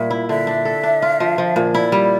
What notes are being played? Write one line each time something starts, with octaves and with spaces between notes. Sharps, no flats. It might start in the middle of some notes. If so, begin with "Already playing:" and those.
Already playing: A#2 G3 E5
E4
D3 E5
D4
A4
D4
F4
F3
F3
A#2
E4 D5
G3